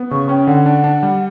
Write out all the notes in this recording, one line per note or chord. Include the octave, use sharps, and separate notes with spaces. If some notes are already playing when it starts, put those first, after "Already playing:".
Already playing: B3
C#3 C#6
C#4 G5
D3 F#5
D4
D4
G3